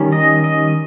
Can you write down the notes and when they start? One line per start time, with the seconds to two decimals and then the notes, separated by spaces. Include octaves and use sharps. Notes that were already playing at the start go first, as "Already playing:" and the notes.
Already playing: D#3 G3 C#4
0.12 D#5
0.44 D#5